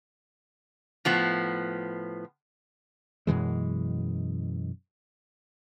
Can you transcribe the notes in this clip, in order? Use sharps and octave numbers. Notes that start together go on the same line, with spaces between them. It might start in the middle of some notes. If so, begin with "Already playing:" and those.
A2 F3 B3
F#2 B2 E3 G#3